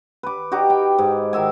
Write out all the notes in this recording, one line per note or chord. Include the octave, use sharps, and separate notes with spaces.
B4 D6
D#4 F#4 G4 D6
G5
G#2
D#3 F#4 E5 G#5